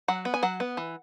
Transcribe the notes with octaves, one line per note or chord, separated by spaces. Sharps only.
F#3 F#5
B3
G#5
F#3 F#5
B3
E3